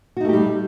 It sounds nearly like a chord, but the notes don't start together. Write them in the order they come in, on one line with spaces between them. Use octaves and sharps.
F#4 D#4 A3 G4 G3